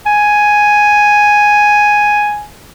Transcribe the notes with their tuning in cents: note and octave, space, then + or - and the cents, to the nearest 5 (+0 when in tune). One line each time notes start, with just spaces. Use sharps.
G#5 +0